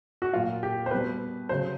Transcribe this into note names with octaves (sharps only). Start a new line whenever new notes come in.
F#4
A#2 F#3 F4
G4
C5
B2 G3 B4
C#3 F#3 C5